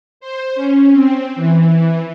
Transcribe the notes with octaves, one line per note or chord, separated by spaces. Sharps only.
C5
C#4
C4
E3